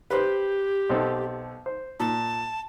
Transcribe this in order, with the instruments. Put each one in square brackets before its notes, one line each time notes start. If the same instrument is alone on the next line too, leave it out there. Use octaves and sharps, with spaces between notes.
[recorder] G4 [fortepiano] B4 C5
[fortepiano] B1 C4 A4
C5
[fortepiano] A#2 [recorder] A5